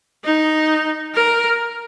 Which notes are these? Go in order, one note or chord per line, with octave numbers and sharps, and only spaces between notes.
D#4
A#4